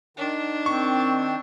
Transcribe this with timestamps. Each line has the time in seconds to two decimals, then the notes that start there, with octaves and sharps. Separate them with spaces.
0.17 D#3 D4
0.66 C4 C#6